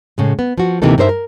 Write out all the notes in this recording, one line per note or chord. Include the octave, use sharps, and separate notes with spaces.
A2 C#3 G#3
B3
F3 F#4
D2 C3 E3 A#3 D#4 A4
G2 D#4 A#4 C5 C#5 E5
A#4